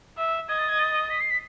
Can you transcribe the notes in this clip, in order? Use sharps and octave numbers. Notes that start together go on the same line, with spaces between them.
E5
D#5 G#6
A6
G#6
A6
B6
C7
B6